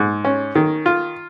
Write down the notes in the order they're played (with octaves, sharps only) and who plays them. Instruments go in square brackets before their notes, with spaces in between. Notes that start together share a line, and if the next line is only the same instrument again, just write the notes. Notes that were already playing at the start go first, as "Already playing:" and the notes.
Already playing: [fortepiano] G#2
C#4
D#3
F4